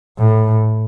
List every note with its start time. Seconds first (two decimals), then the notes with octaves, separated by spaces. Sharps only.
0.18 A2